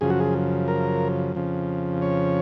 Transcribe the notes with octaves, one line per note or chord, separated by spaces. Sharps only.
F#2 C#3 F3 G#4
F#4
G#4
A#4
F2 C#3 F3
C#5